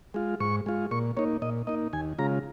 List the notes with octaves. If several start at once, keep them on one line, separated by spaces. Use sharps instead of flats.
G#3 F4
G#2 C#6
G#3 F4
A#2 C#6
A#3 D#4 C#5
A#2 D#5
A#3 D#4 D#5
D#2 G#5
C#3 G#3 F4 A#5